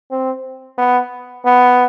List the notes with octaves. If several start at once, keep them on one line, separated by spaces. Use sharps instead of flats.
C4
B3
B3